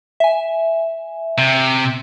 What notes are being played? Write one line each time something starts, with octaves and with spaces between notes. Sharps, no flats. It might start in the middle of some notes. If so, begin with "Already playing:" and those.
E5 G#5
C3